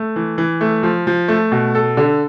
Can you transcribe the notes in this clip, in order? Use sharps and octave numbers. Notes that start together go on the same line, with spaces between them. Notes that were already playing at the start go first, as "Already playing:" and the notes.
Already playing: A3
E3
E3
A3
F3
F3
A3
B2
A4
D3